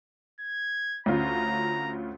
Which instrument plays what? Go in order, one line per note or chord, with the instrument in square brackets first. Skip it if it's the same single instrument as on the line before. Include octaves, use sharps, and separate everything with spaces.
[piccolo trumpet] G#6
[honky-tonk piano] D2 C#4 F4 [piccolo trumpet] A#5